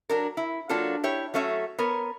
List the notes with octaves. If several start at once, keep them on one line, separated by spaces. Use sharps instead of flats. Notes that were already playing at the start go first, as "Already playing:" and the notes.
F#3 D4 A#4
E4
F#3 A#3 D4 F4 A4
E4 G4 C#5
F#3 A3 C#4 C#5 E5
B3 A#4 C#5